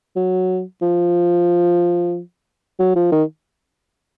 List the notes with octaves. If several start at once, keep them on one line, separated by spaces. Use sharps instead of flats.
F#3
F3
F#3
F3
D#3